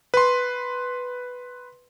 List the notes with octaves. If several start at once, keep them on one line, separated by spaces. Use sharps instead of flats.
B4 C6